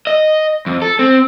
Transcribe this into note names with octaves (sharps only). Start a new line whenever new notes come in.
D#5
F2
A4
C4